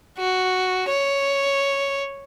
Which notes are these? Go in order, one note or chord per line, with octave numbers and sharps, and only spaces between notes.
F#4
C#5